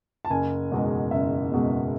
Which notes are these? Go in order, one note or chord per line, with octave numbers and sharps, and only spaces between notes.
A5
F#1 G#5
E2 B2 G#3
F#1 E5
E2 B2 G#3